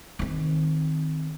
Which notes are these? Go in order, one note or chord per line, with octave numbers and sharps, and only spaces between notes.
D#3 C4